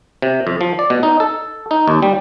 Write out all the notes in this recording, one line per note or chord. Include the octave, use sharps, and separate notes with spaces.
C3
F2
F3
D5
B2
D#4
A4
D#4
D#2
G3